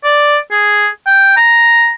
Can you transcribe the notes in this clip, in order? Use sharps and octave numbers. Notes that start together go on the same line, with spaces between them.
D5
G#4
G5
A#5